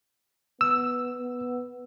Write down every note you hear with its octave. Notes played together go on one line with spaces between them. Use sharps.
B3 E6
B3